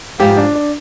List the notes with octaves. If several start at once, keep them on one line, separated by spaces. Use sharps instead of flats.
G#2 F3 B3 G4
D4
D4